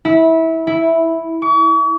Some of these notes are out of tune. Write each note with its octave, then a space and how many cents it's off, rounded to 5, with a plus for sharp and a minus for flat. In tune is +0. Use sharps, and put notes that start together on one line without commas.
E4 -20
E4 -5
C#6 +45